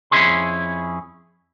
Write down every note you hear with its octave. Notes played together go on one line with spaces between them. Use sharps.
F2 C#4 E4 G#4 C6